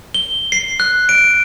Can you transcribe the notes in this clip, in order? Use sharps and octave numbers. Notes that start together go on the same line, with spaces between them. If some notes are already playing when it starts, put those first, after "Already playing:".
G7
C7
F#6
D7